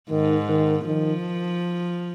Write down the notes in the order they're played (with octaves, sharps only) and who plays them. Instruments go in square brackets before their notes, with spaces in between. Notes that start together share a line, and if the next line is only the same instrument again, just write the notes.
[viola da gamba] G#2 [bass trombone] D#3
[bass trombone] D#3
[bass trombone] D#3 [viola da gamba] F3